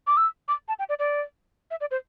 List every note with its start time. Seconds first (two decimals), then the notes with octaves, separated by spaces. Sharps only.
0.07 D6
0.17 E6
0.48 D6
0.68 A5
0.79 G5
0.89 D5
0.99 D5
1.71 E5
1.81 D5
1.91 C5